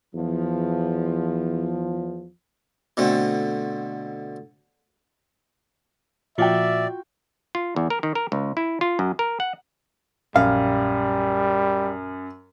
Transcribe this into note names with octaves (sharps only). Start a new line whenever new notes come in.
E2 F3
B2 D3 A3 C4
A#2 F3 F4 F#4 D5 E5 G5
F4
E2
A#4
D#3
A#4
C#2
E4
F4
F#2
A#4
F#5
A#1 F#2 G3 F5